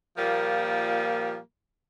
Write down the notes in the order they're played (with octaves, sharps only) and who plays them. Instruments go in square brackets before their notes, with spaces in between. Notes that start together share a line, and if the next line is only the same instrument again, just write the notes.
[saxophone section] A#2 F3 G3 A#3